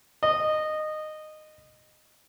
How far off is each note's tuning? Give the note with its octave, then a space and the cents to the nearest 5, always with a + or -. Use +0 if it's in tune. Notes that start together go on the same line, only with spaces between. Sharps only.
D#5 -15